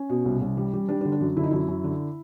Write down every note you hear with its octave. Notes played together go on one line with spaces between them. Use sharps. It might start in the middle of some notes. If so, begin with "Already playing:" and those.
Already playing: C#4
B2
C2
C2
G3
G3
G3 D4
D4
D3
D4
F#2
D3 E4
D#4
F#2 E4
F#2
D3